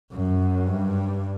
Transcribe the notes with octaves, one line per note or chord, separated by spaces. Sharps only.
F#2
G2